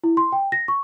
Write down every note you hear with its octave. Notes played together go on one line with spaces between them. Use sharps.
E4
C6
G5
A#6
C#6